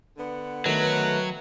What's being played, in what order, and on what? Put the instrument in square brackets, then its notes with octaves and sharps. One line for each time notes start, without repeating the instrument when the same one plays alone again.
[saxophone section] D3 B3
[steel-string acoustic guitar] D#3 A3 [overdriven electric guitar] F#3 [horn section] B4